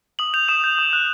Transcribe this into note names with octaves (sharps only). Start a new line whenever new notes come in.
D#6 F#7
G6 F7
D#6 E7
G6
D#6
F#6